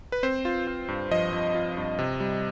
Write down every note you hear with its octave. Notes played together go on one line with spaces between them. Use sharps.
B4
C4 C5
F4
F4
G2
F3 D#5
F3
F4
G2
C3
G3